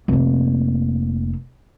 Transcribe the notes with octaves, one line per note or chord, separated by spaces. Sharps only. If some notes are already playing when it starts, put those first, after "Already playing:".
F1 A#3